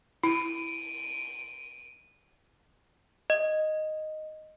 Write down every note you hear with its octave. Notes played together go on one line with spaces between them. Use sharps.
E4 D7 D#7
D#5